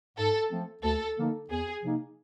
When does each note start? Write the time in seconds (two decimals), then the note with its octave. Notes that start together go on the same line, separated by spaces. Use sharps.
0.17 G#2 A4
0.50 F3 A3 C4
0.83 D2 A4
1.16 D3 F3 A#3 D#4
1.50 E2 G#4
1.83 C3 F3 A#3 D#4